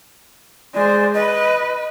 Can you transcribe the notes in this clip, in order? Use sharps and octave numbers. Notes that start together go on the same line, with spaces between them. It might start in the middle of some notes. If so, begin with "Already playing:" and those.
G#3 C5 D5
B4 D#5